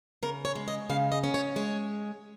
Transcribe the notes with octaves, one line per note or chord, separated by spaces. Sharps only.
C#3 A#4
C#5
G#3
D#5
C#3 F5
D#5
C#4
C#5
G#3 C#5